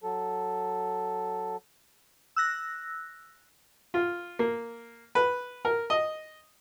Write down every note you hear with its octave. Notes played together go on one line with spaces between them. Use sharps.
F#3 A4
E6 F#6 A#6
F4
A#3
B4
A#4
D#5